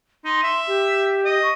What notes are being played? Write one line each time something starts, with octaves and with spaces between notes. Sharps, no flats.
D#4 C6
E5
G4
D#5
C#6